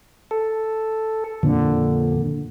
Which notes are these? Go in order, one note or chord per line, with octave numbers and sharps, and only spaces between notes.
A4
F2 A#2 D3